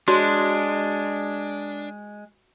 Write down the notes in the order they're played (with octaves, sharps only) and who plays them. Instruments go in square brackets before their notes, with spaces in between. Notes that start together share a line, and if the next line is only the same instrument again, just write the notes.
[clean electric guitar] G#3 [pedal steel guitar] D4 [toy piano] F#4 C#5 C6